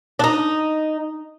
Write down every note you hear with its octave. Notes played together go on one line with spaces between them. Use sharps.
D4
D#4